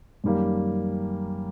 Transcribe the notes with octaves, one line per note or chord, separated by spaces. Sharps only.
F#2 D#3 G3 A#3